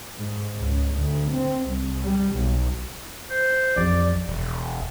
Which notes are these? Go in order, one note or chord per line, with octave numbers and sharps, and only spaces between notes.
G#2
C#2
D2
C4
C2
G3
B1
C5
A1 F2 F3 D5
E1